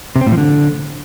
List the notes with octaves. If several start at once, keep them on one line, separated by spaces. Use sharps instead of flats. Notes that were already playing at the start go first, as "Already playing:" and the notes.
C3
C4
A2
F3
D3